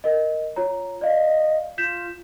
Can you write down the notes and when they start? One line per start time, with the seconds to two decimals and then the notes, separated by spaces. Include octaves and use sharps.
0.04 A#4 D#5
0.56 F4 C#5 A#5
1.01 D5 D#5 F5
1.78 F4 G6 B6 E7